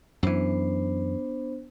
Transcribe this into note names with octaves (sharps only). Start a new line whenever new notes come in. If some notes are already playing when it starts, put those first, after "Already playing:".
F#2 E3 B3 D4 C5